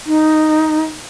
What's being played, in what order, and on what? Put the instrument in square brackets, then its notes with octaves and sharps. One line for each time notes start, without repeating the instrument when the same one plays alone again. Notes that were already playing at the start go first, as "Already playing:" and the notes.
[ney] D#4